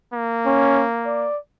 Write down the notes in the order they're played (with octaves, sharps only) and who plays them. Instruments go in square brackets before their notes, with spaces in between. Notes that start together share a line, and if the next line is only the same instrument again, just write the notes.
[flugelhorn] A#3
[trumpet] C#4
D5